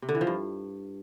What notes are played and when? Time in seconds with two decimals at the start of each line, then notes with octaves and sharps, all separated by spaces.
0.02 C3
0.09 D3
0.15 E3
0.21 F3
0.27 G2